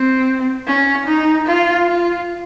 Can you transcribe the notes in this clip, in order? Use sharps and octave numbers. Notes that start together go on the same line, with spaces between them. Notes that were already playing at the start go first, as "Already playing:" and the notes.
Already playing: C4
C#4
D#4
F4
F4